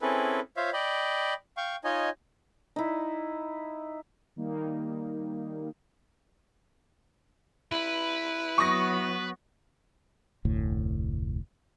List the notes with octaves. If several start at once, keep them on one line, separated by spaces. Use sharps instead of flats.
C4 C#4 E4 G#4 A4 B4
F4 C5 C#5 E5 F5
D5 D#5 G5 B5
F5 G5 C#6
D#4 F4 C#5 D#5 G#5
D#4 E4
D#3 G3 A#3 D#4
E4 B4
F#3 B3 C#6 D#6 A#6
F1 D2 A2